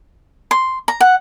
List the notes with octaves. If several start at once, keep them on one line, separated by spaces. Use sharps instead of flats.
C6
A#5
F#5